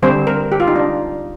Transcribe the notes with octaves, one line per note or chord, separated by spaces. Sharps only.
D3 G3 C4 C5
A#4
G4
F4
D#4
D4